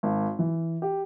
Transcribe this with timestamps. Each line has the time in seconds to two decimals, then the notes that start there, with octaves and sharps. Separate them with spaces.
0.03 G#1
0.39 E3
0.82 G4